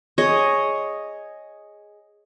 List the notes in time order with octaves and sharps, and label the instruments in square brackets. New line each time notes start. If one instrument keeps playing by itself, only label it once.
[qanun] G#4 C#5 D#5